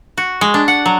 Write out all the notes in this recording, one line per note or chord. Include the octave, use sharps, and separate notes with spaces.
F#4
G#3
D4
F#5
F#3